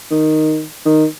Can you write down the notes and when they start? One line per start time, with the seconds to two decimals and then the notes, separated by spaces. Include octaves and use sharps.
0.11 D#3
0.86 D#3